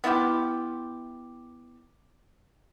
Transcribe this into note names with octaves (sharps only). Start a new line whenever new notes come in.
B3 E4 F4 G4